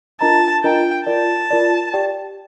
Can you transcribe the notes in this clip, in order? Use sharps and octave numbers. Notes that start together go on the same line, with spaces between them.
D4 F4 A#4 D#5 A5 A#5
D4 F4 A#4 D#5 G5 A#5
F4 A#4 D5 A5
F4 A#4 D5
G4 D5 G5